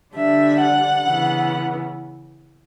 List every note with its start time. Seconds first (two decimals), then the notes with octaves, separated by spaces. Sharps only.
0.14 D3 G3 D4 E5
0.59 F#5
1.05 C#3 E3 B3